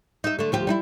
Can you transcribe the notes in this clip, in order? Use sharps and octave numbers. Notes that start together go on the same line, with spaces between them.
D#4 E5
D3 A3
D2 F3 G4
G3 D#4 E4